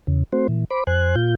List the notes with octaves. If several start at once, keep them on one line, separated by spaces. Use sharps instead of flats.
E2 C#3
A3 C4 F#4 C5
A#2 E3
C5 B5 D6
F2 C5 G#5 F#6
A#2 F4 G6